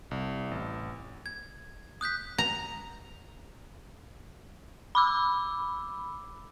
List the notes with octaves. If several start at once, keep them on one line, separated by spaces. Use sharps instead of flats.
C2
A1
G#6
D#6 F#6 G6 B6
A#5
B5 D6 E6